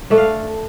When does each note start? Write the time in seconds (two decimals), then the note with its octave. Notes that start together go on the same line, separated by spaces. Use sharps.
0.10 A3 D4
0.18 F5